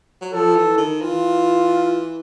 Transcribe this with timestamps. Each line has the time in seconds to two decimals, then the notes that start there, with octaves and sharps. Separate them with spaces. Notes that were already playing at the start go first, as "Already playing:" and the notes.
0.21 F#3
0.33 F3 A4
0.56 E3
0.78 D#3
1.00 E3 F4